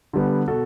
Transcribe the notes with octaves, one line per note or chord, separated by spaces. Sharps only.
D3 G3 B3
B2 F#4 A4